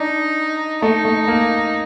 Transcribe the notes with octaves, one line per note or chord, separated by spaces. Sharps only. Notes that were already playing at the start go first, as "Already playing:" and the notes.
Already playing: D4 D#4
A3 D#4
A3
A#3